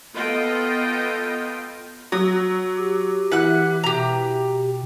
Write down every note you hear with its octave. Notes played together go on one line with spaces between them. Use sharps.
B3 F4 A4 D#5 G5
F#3 D#6
G4
E3 B4 F#5 F#6
B2 G4 A#5